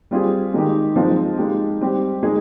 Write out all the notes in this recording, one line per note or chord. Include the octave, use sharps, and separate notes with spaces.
G3 C4 F4 G#4
D#3 G#3 D#4 G4
F3 G#3 C4 D#4
G#3 D#4 G4
G3 C4 G4
G#3 D#4 G#4